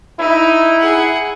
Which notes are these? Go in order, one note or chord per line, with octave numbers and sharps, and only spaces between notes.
D#4 E4
G#4 F#5